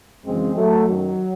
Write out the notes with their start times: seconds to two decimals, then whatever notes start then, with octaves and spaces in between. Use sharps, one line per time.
0.25 F#2 C#3 E3 G#3 C4
0.56 F#3 A3
0.88 F#2 D#3 F#3